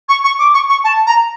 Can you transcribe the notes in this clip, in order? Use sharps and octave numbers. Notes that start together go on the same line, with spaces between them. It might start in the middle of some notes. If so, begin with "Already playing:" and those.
C#6
C#6
D6
C#6
C#6
A5
A#5